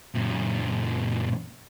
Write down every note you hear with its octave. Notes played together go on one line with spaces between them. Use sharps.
F#2 A#2